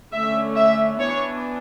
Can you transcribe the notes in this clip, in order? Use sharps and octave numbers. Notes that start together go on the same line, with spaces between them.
D3 A3 C#4 E5
E5
E3 B3 D4 C#5